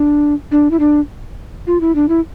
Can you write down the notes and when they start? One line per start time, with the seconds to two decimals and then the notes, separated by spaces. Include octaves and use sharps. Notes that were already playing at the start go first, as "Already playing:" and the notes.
Already playing: D4
0.51 D4
0.71 E4
0.80 D4
1.67 F4
1.81 E4
1.95 D4
2.09 E4